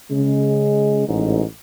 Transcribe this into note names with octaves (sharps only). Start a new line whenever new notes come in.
C#3 G#3
A1 G#2